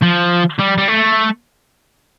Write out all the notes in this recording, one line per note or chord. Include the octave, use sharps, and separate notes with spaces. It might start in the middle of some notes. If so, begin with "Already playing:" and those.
F3
G3
G3
A3